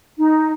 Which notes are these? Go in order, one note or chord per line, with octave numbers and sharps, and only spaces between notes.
D#4